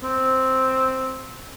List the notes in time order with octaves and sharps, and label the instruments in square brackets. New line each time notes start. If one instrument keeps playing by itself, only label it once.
[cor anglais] C4